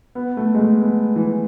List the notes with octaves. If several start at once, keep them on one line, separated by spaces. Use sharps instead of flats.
B3
A3
G#3
A3
B3
E3